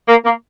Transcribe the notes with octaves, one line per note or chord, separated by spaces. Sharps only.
A#3
A#3